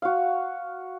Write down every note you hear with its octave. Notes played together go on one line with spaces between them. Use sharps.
F#4 F5